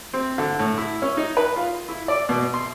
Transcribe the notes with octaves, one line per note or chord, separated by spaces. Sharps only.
C4
D3
A2
E4
C#4
D#4
B4
F4
E4
D5
B2
C6